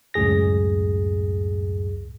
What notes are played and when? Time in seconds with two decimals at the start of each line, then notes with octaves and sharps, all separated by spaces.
0.14 C#2 F#2 A2 G#4 A#6